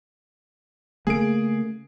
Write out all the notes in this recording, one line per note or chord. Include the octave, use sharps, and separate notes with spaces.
C#3 A3 A#3 G#4 D7